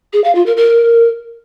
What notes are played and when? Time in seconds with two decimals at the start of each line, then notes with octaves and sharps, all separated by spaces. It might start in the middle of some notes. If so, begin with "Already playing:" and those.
0.13 G#4
0.24 F5
0.35 F4
0.46 A#4
0.57 A#4